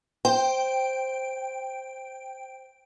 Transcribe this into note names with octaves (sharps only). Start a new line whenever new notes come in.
C5 G5